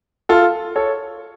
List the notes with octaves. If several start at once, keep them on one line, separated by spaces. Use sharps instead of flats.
F4 A4
A4 C#5